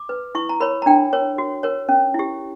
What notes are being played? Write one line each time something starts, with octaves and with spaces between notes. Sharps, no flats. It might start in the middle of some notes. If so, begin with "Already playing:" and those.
Already playing: D6
B4
E4 C#6
A#5
A#4 C#5 B5
A#5
D4 G5
A#4 C#5
F#4
A#4 C#5
C#4
E4 G4